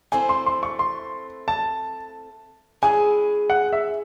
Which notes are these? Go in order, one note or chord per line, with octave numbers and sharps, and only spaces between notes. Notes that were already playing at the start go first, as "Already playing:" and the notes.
A3 C4 E4 C5 G#5
C6
C6
C#6
C6
A5
G#3 C#4 E4 G#4 G#5
F#5
E5